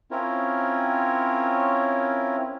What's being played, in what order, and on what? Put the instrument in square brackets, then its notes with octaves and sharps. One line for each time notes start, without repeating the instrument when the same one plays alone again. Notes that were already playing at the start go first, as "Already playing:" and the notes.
[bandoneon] C4 C#4 E4 F4 A#4 C#5